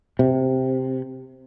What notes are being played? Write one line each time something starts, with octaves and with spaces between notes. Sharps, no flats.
C3